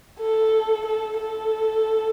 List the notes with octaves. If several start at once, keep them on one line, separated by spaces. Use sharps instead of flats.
A4
A4
A4